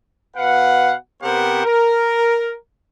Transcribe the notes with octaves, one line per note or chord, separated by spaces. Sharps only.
B2 B4 F5 F#5
C3 B3 G4 A#4 C5 F#5
A#4